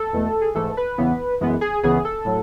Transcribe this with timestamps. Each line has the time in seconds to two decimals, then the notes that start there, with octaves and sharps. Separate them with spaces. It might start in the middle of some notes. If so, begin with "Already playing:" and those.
Already playing: A4
0.13 E2 B2 A3
0.41 G#4
0.55 G#2 E3 A3 A4
0.77 B4
0.98 E2 C#3 E3 B3
1.41 F#2 E3 G#3 B3
1.61 G#4
1.83 C#2 C#3 E3 B3 G#4
2.05 A4
2.25 A2 F#3